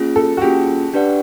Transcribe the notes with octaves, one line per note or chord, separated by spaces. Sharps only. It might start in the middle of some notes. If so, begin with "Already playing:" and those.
Already playing: A#3 C#4 F4 G#4
A4
F#4
A#3 C#4 F4 G4 G#4
D4 G4 B4 D5 F#5